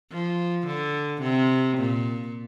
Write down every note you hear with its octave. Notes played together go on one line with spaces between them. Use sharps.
F3
D3
C3
A#2